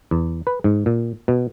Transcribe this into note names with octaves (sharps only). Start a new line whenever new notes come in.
E2
B4
G#2
A#2
B2